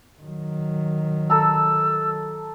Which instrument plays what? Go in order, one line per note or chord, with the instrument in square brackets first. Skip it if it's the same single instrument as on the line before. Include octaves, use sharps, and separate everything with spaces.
[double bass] D#3 F#3
[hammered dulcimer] A4 A#5 [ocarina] E6